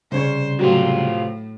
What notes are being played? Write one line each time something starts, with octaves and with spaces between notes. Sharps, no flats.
C2 C#3 C5 C#5
A2 C3 F#3 C4 F4